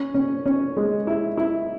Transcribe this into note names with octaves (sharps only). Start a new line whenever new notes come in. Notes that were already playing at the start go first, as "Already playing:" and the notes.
Already playing: C#4
C#4
C#4
G#3
E4
E4